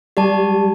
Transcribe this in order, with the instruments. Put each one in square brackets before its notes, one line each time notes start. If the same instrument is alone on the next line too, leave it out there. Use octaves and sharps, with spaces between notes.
[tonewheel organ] G3 [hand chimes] G4 D5 A5